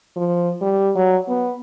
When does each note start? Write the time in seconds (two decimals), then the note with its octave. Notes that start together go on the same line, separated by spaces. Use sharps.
0.16 F3
0.61 G3
0.95 F#3
1.28 B3